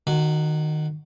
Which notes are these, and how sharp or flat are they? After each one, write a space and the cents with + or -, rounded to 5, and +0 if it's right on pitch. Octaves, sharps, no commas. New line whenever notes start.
D#3 -20 F#4 +0